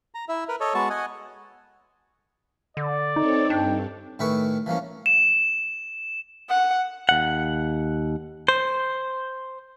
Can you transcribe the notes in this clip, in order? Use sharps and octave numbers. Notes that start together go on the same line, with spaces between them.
A#5
E4 E5
A#4 B4
A4 C#5 D#5
G#3 B3 F#4 A5 C#6
D#5 F#5 G#5
D3 D5
C4 D#4 A4 C#5
G2 D4 G5
A2 D#3 E4 B4 G#5 C#6
E3 F3 A#3 C#4
E7
F#5
D#2 F#5
C5